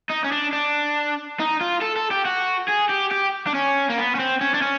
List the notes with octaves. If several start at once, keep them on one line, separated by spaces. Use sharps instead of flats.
D#4
C#4
D4
D4
D#4
F4
A4
A4
G4
F#4
G#4
G4
G4
D4
C#4
A#3
B3
C#4
C4
C#4
D4
C#4